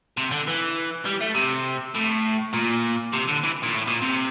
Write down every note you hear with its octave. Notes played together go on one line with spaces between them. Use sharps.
C3
D3
E3
G3
A3
C3
A2
A#2
C3
D3
E3
A#2
A2
A#2
C3